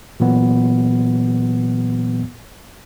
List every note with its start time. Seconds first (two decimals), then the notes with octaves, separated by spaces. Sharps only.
0.20 A#2 E3 F#3 B3